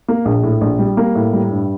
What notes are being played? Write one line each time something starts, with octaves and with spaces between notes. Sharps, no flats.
A#3
A#1
A2
A#1
G3
A#3
A2
G3
G2